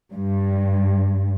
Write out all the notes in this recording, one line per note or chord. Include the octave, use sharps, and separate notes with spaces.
G2